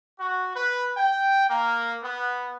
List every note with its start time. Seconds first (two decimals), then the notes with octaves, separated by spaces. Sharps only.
0.18 F#4
0.56 B4
0.98 G5
1.50 A#3
2.04 B3